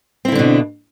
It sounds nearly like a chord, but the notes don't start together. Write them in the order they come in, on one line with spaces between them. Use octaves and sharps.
C4 E4 D3 D4 B2